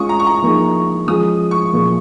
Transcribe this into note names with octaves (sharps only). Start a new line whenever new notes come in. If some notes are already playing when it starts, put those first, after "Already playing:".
Already playing: G#3 C#4 F4 C#6 D#6
A#5
C#6
A#5
F3 A#3 D#4 G#4
F3 G#3 C#4 F4 G#4 D#6
C#6
A#2 F3 A#3 F4 G#4